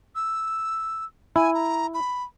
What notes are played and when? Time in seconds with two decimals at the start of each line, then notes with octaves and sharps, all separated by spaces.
0.15 E6
1.36 E4 G#5
1.54 A#5
1.94 B5